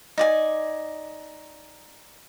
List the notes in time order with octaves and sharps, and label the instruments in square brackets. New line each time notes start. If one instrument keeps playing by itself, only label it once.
[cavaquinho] D#4 D5 G#5